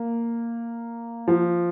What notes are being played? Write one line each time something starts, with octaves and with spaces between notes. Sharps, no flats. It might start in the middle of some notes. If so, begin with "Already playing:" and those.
Already playing: A#3
F3